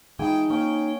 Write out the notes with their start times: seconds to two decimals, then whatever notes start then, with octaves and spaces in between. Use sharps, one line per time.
0.19 E3 G#3 D#4 G#4 G5
0.50 A#3 C#4 G#4 G5